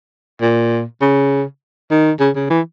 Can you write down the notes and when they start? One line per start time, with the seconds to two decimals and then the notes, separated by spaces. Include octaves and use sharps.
0.41 A#2
1.01 C#3
1.91 D#3
2.20 C#3
2.36 C#3
2.50 E3